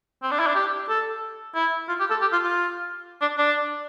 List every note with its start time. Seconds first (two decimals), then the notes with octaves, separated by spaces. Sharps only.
0.23 C4
0.31 D4
0.39 E4
0.47 D4
0.55 G4
0.89 A4
1.55 E4
1.88 F4
2.00 G4
2.10 A4
2.21 G4
2.32 F4
2.43 F4
3.21 D4
3.38 D4